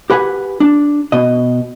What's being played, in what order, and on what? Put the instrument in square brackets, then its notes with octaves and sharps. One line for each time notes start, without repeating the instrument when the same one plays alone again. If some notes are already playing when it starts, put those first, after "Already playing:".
[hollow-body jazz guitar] G4 B4 F#5 G#5
D4
B2 D#5